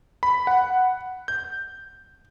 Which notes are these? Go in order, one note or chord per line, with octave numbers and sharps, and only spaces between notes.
B5
F#5
G6